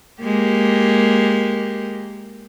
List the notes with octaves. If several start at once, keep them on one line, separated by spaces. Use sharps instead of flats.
G#3 A#3 G4